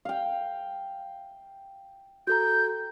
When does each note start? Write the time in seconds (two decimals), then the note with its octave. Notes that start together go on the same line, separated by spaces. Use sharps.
0.05 F5 G5
2.27 F#4 A4 A#5 G6